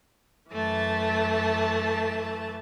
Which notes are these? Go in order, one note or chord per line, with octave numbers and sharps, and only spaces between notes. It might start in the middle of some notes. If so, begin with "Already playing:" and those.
F#2 E3 A3 A5